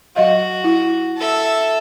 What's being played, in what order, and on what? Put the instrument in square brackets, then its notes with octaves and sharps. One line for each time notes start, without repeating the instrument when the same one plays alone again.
[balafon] F#3 D#5 F5 [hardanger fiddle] F#4
[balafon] E4
[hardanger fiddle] A4 E5